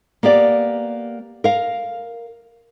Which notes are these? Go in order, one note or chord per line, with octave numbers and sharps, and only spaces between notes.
A#3 B3 G4 D5
A#4 F5